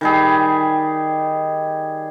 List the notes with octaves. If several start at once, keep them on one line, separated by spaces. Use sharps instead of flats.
D#3 G3 G#4